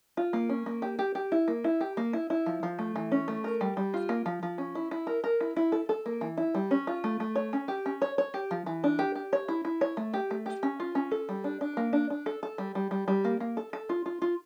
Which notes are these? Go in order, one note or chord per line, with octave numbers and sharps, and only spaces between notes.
F4
A#3
C#4
A#3
G4
G4
G4
E4
A#3
E4
G4
A#3
E4
E4
F3
F3
A3
E3
C#4
A3
A#4
G3
G3
F4
A#3
F3
F3
C#4
E4
E4
A#4
A#4
E4
E4
A4
A4
A#3
E3
E4
G3
C#4
F4
A3
A3
C#5
C#4
G4
C#4
C#5
C#5
G4
F3
E3
D4
G4
G4
C#5
E4
E4
C#5
A3
G4
A3
G4
C#4
F4
C#4
A4
G3
D4
D4
A#3
D4
D4
A4
A4
G3
G3
G3
G3
A#3
A#3
A4
A4
F4
F4
F4